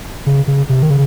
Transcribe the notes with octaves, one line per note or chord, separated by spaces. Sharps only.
C#3
C#3
C3
D#3
C#3